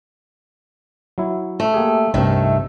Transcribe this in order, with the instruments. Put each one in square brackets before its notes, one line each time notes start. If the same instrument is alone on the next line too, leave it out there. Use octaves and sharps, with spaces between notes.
[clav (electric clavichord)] F#3 E4
[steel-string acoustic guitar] A3
[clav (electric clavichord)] A#3 G4 G#4
[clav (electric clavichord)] C2 G2 C3 [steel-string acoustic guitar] D#3 A3